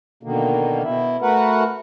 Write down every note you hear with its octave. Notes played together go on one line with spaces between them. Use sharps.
B2 D3 D#3 A#3
B2 E4
A3 F#4 A#4 B4 F#5